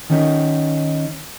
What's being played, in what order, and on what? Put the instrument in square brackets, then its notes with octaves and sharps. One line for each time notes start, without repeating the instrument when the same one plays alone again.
[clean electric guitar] D#3 C#4 D#4